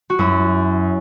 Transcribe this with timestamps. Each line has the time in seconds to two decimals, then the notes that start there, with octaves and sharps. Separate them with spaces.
0.10 F#4
0.19 F#2 E4